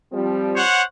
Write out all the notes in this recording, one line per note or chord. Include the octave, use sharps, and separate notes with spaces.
F3 G3 C4
C5 C#5 F#5